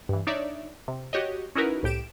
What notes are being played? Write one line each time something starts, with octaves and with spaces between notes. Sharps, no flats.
G2 E3
D4 D#4 C#5 D5 E5
C3
F#4 G4 C#5 D#5
C#4 D#4 E4 F#4 A#4 B4
C2 A2 G4 D7 E7